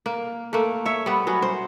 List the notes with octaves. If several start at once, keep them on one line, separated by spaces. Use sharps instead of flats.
A#3
A3 A#3
C#5 E5
G3 B3
F#3 B3 C#4
C5